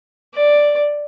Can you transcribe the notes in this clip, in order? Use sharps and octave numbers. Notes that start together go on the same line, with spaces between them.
D5